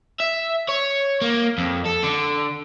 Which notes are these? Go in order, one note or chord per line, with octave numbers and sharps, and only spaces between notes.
E5
C#5
A#3
F2
A4
D3